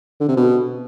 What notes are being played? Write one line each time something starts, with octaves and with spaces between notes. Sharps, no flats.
D3
C3
B2